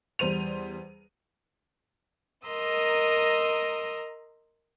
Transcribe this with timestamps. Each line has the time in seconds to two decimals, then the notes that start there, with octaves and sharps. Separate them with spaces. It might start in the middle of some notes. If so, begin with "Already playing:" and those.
0.19 E2 G3 C5 D#7 F7
2.48 A#4 D#5 A#5 C6 D#6 E6